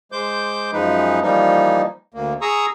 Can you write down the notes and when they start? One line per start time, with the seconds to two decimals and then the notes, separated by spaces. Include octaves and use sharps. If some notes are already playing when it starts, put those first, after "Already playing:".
0.12 G#3 C5 D6 G6
0.73 F#2 F3 G#3 D#4 B4
1.22 E3 F3 G3 A#3 D#4
2.14 D2 A#3
2.42 G#4 A#5 C#6 D#6 E6